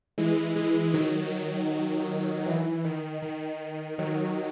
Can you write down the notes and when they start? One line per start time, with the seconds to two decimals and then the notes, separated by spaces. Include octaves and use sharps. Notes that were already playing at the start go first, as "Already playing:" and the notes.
0.18 E3 G#3
0.55 E3 G#3
0.94 D#3 F#3
2.46 E3
2.85 D#3
3.22 D#3
3.98 D#3 F#3